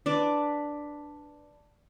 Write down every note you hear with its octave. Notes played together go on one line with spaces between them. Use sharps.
D4 B4 D5